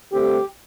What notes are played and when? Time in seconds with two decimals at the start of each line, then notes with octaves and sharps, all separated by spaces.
0.12 G2 D3 A3 C4 G4